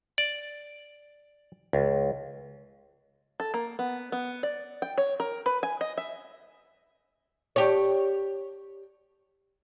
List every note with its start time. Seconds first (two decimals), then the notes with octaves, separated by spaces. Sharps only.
0.18 D5
1.73 C#2
3.40 A4
3.54 A#3
3.79 B3
4.12 B3
4.43 D5
4.82 G5
4.98 C#5
5.20 A#4
5.46 B4
5.63 G#5
5.81 D#5
5.98 E5
7.56 G4 C#5